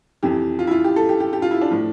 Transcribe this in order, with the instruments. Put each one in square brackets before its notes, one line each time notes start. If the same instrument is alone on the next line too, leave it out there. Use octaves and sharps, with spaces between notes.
[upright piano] F2 C3 E3 G4
F4
E4
F4
G4
A4
G4
G4
G4
F4
E4
D4
A2 F3